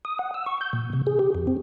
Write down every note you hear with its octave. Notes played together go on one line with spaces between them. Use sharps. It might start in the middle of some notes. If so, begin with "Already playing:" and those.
D#6
F#5
E6
C#6
G6
A#2
C3
G#4
G4
F2
C4